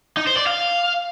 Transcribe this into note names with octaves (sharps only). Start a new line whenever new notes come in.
D#4
C5
D5
F5